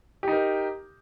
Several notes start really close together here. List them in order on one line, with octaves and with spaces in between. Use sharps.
G4 D#4 A#4